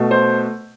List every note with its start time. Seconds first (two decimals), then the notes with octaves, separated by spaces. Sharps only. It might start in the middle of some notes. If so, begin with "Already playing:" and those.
Already playing: B2 A3
0.11 C5